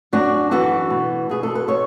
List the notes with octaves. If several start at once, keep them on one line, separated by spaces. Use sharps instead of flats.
F#2 D4 F#4
E3 F#4 A4
B2
B2 G#4
A4
B4
B2 A4 C#5